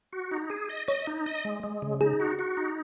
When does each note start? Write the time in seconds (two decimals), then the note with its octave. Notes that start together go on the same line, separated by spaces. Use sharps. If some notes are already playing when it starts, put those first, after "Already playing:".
0.13 F#4
0.31 D#4
0.50 G#4
0.69 D#5
0.88 C#5 D#5
1.07 D#4
1.26 D#5
1.45 G#3
1.63 G#3
1.82 C#3
2.01 D#4 G#4
2.20 F#4
2.39 F#4
2.57 D#4